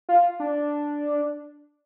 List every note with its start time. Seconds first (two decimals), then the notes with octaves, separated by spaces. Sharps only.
0.09 F4
0.40 D4